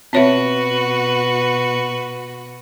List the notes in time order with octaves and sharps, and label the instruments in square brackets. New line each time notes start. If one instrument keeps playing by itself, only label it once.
[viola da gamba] B2 F#4 B4 [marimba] C4 C#5 E5